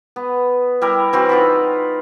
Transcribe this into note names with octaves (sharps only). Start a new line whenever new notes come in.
B3
G3 E4 A#4
E3 C4 F#4
D#4 F4 F#5 B5